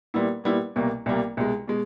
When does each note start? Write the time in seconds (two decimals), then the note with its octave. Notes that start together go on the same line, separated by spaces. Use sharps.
0.14 A#2 G3 B3 E4
0.44 A#2 G3 B3 E4
0.76 C2 B2 G3 A#3
1.06 C2 B2 G3 A#3
1.37 C2 B2 G#3
1.68 B2 G#3